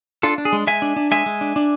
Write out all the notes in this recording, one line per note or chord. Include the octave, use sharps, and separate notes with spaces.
D4 F4 A4
D4
G#4
G#3
G#3 E5 G#5
D4
D4
G#3 E5 G#5
G#3
D4
D4